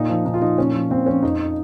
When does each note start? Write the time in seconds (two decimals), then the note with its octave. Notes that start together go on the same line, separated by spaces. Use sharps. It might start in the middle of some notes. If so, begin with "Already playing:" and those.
Already playing: A#2 D#4
0.09 F3
0.25 A#2 D#4
0.34 F4
0.41 F3 D#4
0.58 A#2 C#4
0.74 F3
0.90 A#2 C4
1.06 F3 C#4
1.23 F2 D#4